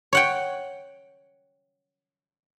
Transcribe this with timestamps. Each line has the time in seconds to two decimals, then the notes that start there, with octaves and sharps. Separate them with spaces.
0.13 C#5 F#5 G5